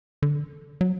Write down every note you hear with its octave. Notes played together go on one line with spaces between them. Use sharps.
D3
F#3